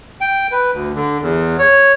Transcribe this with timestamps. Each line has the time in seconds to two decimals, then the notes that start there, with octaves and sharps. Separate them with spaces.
0.21 G5
0.52 B4
0.72 D2
0.95 D3
1.22 E2
1.59 C#5